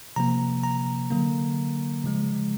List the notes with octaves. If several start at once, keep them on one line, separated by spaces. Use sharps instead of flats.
C3 F3 A#3 A#5
A#5
D3 F#3 A#3
C#3 F3 G#3